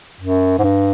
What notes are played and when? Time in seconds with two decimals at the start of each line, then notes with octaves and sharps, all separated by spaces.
0.21 F#2
0.59 G#2
0.64 G2